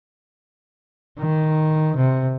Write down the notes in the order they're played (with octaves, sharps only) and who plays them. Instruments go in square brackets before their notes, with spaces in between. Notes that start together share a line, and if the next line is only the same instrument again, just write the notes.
[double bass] D#3
C3